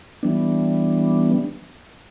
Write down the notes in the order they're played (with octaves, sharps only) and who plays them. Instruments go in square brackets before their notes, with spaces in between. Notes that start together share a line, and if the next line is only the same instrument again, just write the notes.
[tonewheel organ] E3 G3 B3 D4